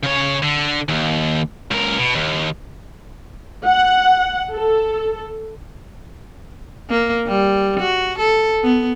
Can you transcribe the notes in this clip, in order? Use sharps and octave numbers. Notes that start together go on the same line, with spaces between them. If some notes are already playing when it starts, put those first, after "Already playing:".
C#3 C#5
D3
D#2
C#2 A#4
B2
D#2
F#5
A4
A#3
G3
F#4
A4
B3